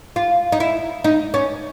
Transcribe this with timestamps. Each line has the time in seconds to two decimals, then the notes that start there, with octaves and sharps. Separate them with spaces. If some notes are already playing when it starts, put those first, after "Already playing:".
0.16 F4
0.52 D#4
0.60 E4
1.04 D#4
1.34 C#4